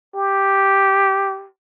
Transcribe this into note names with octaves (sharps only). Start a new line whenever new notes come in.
G4